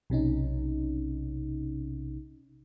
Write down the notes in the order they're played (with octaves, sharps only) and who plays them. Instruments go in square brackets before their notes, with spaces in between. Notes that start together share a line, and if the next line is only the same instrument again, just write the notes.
[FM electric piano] B1 C3 C#4 D#4